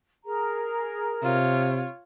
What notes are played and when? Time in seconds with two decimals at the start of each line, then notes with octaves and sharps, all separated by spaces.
0.25 G#4 A#4 A#5
1.23 C3 F4 C#5